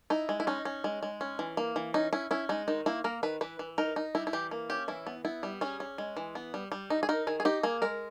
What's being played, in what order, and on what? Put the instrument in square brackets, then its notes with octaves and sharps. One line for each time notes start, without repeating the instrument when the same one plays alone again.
[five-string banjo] D#4 E4
G#3
E4
C#4 D#4
C#4
G#3
G#3
C#4
E3
A#3
E3
C#4 D#4
C#4 E4
C#4 E4
G#3 D#4
D#3 D#4
A#3 E4
A#3 A#4
D#3 B4
E3 B4
E3
D#4 A#4
D#4
G3 E4
E4
E3 G4
A#3
C#4 G4
E3 E4
B3
B3 E4
G3
C#4 G#4
C#4
G#3
E3
B3
G3
G3
D#4
G#4
D#4 A#4
D#3 G#4
G#4
D#4 G4
A#3 G#4
G#3 A#4